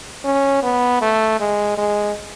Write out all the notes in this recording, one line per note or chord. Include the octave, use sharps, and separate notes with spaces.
C#4
B3
A3
G#3
G#3